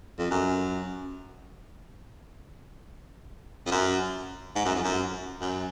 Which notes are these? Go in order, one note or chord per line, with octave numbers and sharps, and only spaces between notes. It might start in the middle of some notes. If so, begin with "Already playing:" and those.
F2
F#2
F2
F#2
G#2
F#2
F2
F#2
F#2